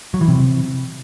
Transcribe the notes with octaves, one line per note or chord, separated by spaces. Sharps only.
F#3
E3
C3